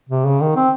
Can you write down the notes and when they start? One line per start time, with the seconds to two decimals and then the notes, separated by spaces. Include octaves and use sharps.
0.09 C3
0.25 C#3
0.41 D#3
0.56 C4